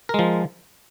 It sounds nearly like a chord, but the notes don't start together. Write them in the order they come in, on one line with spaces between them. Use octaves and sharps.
A#4 G#3 F3